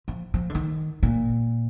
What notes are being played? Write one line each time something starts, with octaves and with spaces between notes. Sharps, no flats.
F3
F3
D3
D#3
A#2